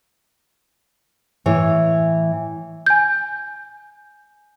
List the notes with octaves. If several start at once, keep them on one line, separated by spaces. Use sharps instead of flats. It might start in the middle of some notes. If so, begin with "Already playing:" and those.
A2 E3 C#5
G#5 G6